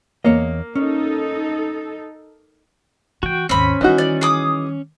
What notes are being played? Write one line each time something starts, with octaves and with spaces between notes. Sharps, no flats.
E2 A#3 C#5 D#5
C#4 D#4 A4
E3 F#4 G5
G#1 D#2 C4 C#4 B5
D#3 E3 G3 D#4 F#4
D5
G#4 D6 D#6